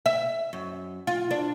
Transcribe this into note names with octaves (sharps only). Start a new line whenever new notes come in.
E5
F#2
F4
D4